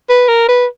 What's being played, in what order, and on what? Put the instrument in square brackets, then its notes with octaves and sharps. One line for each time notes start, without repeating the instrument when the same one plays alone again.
[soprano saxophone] B4
A#4
B4